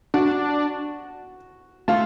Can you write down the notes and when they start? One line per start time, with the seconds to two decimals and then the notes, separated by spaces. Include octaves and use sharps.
0.14 D4 F#4
1.88 A3 F4